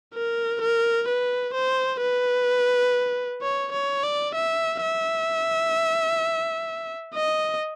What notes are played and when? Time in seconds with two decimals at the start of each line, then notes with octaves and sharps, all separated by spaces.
0.14 A#4
0.61 A#4
1.08 B4
1.54 C5
2.01 B4
3.42 C#5
3.72 C#5
4.03 D5
4.35 E5
4.82 E5
7.15 D#5